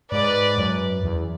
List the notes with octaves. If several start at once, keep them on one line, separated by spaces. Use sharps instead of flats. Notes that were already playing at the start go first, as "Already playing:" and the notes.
G#2 B4 D5
F#2
E2